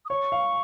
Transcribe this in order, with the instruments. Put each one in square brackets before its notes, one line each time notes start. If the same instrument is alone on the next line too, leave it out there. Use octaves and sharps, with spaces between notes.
[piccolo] D#6
[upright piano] C#5 [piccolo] C#6
[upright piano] F5